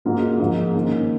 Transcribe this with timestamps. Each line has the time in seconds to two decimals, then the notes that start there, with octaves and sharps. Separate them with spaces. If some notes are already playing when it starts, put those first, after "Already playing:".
0.05 G#2 F#3 A#3 C#4 F4
0.39 G#2 F3 A#3
0.74 D#3 A#3 C#4